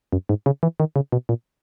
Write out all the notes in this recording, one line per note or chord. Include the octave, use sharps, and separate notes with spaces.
F#2
G#2
C#3
E3
D#3
C#3
B2
A#2